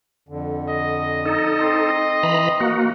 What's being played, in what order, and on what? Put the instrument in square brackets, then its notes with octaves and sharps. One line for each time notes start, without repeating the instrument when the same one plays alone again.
[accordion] F2 D3
[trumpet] D#5
[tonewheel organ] D#4 A4
[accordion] C4 C6
[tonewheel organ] E3 A#5 B5
A#3 F#4